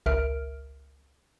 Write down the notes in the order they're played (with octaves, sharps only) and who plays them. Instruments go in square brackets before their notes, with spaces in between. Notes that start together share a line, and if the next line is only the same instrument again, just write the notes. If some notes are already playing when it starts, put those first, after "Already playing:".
[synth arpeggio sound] G#1 C#2 A#4 E5 F6 D7